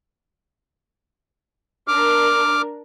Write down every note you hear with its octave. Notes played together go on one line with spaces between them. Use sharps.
D4 A#4 D6 F6